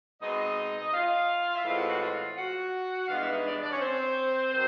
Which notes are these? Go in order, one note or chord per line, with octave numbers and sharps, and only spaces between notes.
B2 G#3 C4 D#4 D#5
F4 F5
E5
A2 E3 G#3 C4 F4 F5
F#4 F#5
F#4 F#5
F4 F5
F#4 F#5
G2 E3 G#3 B3 F4 F5
E4 E5
D#4 D#5
D4 D5
D4 D5
C#4 C#5
C4 C5
D#3 F#3 C4 C5